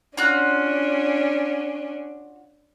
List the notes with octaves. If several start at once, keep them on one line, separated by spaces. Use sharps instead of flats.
C#4 D4 F4 F#4 F#6